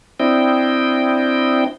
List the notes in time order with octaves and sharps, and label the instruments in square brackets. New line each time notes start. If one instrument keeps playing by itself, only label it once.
[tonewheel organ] C4 D4 E4 D#5 G5